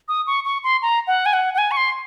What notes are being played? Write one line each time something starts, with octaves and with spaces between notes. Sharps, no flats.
D#6
C#6
C#6
C6
A#5
F#5
G#5
F#5
F#5
G#5
C#6
C6